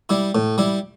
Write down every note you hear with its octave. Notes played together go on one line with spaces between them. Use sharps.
G3 E4
A2
G3 E4